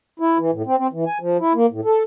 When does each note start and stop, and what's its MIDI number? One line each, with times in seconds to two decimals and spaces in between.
0.20 0.38 64
0.38 0.51 52
0.52 0.62 45
0.66 0.77 60
0.77 0.87 60
0.93 1.05 52
1.07 1.18 80
1.20 1.37 53
1.40 1.53 64
1.55 1.66 58
1.71 1.81 45
1.85 2.03 69